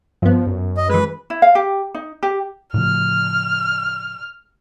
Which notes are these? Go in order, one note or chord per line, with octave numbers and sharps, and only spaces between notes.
G2 F3 B3
F#2
D#5
E3 G#3 B4
E4
F5
G4
D#4
G4
A2 C#3 F3 F6